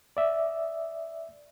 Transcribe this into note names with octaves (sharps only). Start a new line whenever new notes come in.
D5 E5